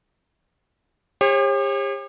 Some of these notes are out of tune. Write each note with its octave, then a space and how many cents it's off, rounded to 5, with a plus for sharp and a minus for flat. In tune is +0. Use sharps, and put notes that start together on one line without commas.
G4 +40 C#5 -40